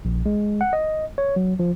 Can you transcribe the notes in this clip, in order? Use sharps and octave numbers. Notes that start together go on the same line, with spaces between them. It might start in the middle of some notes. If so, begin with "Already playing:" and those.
A#1
G#3
F#5
D#5
C#5
F#3
F3